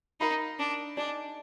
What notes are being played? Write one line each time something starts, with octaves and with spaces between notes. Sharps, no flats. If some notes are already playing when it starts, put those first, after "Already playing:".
D#4 A#4 F5 B5
D4
D4 D#4 G#4 D5